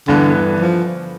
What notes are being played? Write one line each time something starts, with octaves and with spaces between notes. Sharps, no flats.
G2 D3 E3 B3
F3